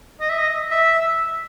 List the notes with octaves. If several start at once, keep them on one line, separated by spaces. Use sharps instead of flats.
D#5
E5
D#5
E5